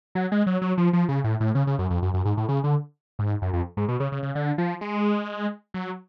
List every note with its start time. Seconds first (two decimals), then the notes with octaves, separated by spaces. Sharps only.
0.15 F#3
0.32 G#3
0.47 F#3
0.62 F#3
0.78 F3
0.93 F3
1.09 C#3
1.24 A2
1.40 A2
1.55 C#3
1.67 C#3
1.79 F#2
1.90 F2
2.02 F#2
2.14 F#2
2.25 G#2
2.37 A2
2.49 C#3
2.64 D3
3.19 G#2
3.42 F#2
3.53 F2
3.77 G#2
3.88 B2
4.00 C#3
4.12 C#3
4.23 C#3
4.35 D3
4.58 F3
4.81 G#3
5.74 F#3